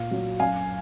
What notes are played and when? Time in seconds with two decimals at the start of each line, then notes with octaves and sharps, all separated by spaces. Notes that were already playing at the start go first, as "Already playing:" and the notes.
Already playing: A#2 F5
0.11 F#3
0.40 F#2 F5 G#5